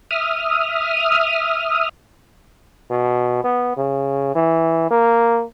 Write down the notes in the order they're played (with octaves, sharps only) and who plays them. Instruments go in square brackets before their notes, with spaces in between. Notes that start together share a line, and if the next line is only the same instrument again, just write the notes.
[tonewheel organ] E5 D#6 F6
[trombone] B2
B3
C#3
E3
A#3